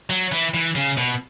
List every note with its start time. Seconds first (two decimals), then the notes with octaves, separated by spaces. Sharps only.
0.10 F#3
0.32 E3
0.54 E3
0.75 C#3
0.98 B2